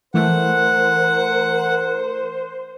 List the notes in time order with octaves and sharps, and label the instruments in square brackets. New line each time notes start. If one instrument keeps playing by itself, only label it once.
[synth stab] E3 A3 [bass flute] A#4 [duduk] C5 [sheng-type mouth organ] F#5